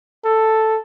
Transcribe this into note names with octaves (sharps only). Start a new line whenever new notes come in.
A4